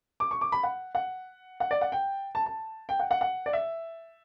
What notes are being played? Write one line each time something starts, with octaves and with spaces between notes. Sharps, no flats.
D6
C#6
D6
B5
F#5
F#5
F#5
D5
F#5
G5
A5
A5
G5
F#5
F#5
F#5
D5
E5